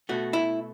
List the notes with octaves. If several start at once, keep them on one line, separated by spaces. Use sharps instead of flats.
B2 A3 F#4
E4